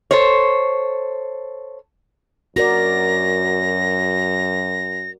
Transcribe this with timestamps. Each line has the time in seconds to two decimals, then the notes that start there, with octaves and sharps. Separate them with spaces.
0.11 A4 C5 C#5
2.56 F#2 F#4 A#4 D5 A#6